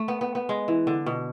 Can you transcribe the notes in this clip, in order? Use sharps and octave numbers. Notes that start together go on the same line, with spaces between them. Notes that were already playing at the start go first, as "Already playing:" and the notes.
Already playing: A3
B3
B3
B3
G#3
E3
D3
B2